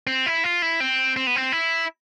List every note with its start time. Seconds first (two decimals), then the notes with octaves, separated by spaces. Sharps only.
0.07 C4
0.26 E4
0.44 F4
0.62 E4
0.80 C4
1.16 C4
1.27 B3
1.36 C4
1.52 E4